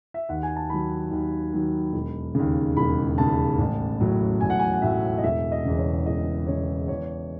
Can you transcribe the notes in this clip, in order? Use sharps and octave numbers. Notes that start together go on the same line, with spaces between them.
E5
D#2 F#5
G#5
A5
D#3 F#3 B5
D#2
D#3 F#3
E1
D#2 C#3
E1 B5
D#2 C#3 A5
A1
A2 F#3
A1 G#5
F#5
G#5
F#5
A2 F#3 E5
D#5
E1 E5
D#5
E2 C#3
C#5
E1 D#5
E2 C#3 C#5
E2 C#5